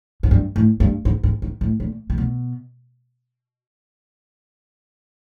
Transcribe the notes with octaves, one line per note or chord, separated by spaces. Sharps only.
G#2
G2
A2
G2
G#2
G#2
G#2
A2
A#2
C3
B2